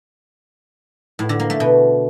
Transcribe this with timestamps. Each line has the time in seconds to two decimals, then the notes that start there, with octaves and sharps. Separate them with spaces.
1.19 A2
1.29 D3
1.40 A#3
1.50 A3
1.60 B2